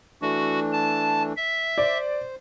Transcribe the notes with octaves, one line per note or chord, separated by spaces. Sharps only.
E3 A3 D4 F#4
A5
E5
C5 D5